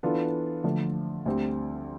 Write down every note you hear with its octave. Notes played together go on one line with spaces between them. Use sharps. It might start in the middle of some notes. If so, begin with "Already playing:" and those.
E3 B3 D4 F4 A4
D3 F3 A3
D2 D3 G3 C4